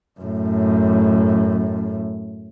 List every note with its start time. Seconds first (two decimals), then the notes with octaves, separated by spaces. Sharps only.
0.21 F#2 A2